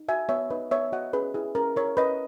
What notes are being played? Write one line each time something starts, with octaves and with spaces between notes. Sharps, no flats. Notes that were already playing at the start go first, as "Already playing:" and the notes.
Already playing: D#4
F#4 E5 G#5
B3 C#5 E5
D#4 B4 D#5
B3 C#5 E5
F#4 D#5 F#5
C#4 G#4 B4
E4 G#4
C#4 A#4
E4 A#4 C#5
C#4 B4 D#5